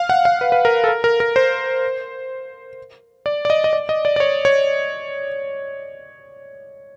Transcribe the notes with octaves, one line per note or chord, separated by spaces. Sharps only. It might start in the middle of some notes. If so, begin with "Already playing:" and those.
Already playing: F5
F#5
F5
B4
B4
A#4
A4
A#4
A#4
A#4
C5
D5
D5
D#5
D#5
D5
D#5
D5
D5
C#5
C#5